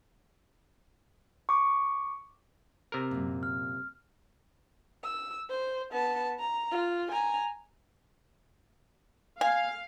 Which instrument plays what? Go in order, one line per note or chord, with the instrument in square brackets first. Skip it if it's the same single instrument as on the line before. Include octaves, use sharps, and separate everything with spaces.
[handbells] C#6 D6
[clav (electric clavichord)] C3 A#4
[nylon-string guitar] F#2 A#2
[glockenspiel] F6
[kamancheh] E6
C5
B3 A5
A#5
F4
G#5 A#5
[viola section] F5 [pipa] G#5